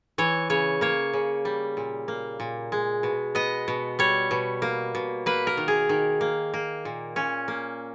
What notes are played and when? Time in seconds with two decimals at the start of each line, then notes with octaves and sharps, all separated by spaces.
0.18 E3 C#5
0.50 C#3 C#5
0.81 A#3 C#5
1.13 C#3
1.45 G3
1.77 A#2
2.08 A#3
2.40 A#2
2.72 G#3
3.03 B2
3.35 B3 D#5
3.68 B2
3.99 G3 C#5
4.31 B2
4.62 A#3
4.95 B2
5.26 A#3 B4
5.47 A#4
5.57 D#3
5.68 G#4
5.89 D#3
6.21 A#3
6.54 A#3
6.85 A#2
7.16 A#2 C#4
7.48 A#3